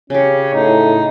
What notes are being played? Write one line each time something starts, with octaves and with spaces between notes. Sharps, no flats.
C#3 C#4 G4
A2 D#4